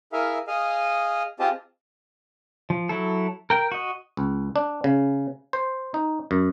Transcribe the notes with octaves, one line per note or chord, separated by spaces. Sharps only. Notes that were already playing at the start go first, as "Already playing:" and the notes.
E4 G#4 A#4 E5 F5
G#4 D#5 F5
C4 F4 G4 G#4 D#5 A5
F3
F#3 E4 A4
A#4 G5
F#4 D#5
C#2
D4
C#3
C5
D#4
F#2